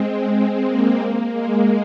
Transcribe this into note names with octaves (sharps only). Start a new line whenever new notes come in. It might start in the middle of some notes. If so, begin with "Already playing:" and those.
Already playing: G#3 C4
A#3
G#3